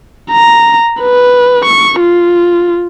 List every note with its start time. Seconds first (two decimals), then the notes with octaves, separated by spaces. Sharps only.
0.31 A#5
1.01 B4
1.65 C#6
2.00 F4